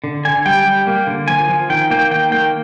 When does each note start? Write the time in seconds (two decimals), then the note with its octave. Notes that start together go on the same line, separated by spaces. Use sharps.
0.04 D3
0.25 D3 G#5
0.45 G3 G5
0.66 G3
0.87 A#3
1.07 D3
1.28 F3 G#5
1.49 F3
1.70 D#3 G5
1.91 A#3 G5
2.11 D#3 G5
2.32 A#3 G5